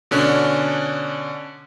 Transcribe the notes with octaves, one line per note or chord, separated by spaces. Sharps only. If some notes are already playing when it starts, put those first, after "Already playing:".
B2 D3 C#4 D4